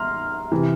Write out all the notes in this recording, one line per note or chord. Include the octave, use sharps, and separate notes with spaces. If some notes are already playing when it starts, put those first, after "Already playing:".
Already playing: A#5 C6 F6
C3 E3